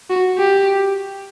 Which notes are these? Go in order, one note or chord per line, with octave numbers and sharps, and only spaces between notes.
F#4
G4